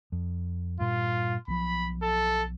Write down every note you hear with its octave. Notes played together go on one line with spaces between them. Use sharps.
F2
G2 A#2 F4
B1 F3 B5
A4